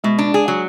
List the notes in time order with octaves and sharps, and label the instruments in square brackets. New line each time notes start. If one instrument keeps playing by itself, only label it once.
[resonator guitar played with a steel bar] B2 [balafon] G#3
[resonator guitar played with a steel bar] D4
G#4
F#3